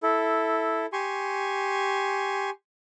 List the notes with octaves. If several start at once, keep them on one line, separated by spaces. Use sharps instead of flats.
E4 A4
G4 G#5 C6 C#6